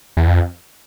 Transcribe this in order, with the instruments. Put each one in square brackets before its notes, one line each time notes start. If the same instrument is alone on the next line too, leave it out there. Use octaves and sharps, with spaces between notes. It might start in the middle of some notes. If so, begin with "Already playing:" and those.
[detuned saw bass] E2
F2